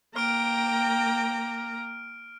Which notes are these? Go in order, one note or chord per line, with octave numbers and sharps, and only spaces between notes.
A#3 G5 A#5 D6 F6 D7